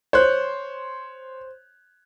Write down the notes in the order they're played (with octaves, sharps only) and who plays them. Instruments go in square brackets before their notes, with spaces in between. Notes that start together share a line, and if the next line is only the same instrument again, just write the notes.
[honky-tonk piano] C5 [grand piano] C#5 F#6 G6